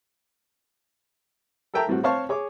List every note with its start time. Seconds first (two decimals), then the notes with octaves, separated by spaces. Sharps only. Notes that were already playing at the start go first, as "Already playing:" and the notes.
1.74 A4 A#4 E5 G5 A5 A#5
1.88 A2 G3 C4 F#4
2.03 C4 C5 C#5 F5 A5 C#6
2.29 G#4 C#5 D6